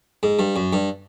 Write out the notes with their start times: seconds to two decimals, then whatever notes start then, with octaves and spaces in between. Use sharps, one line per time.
0.23 G#2
0.39 G2
0.56 F#2
0.73 G2